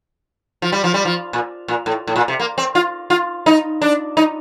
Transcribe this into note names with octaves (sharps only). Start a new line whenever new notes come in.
F3
G3
F3
G3
F3
A#2
A#2
A2
A2
A#2
C3
A#3
C4
F4
F4
D#4
D4
D#4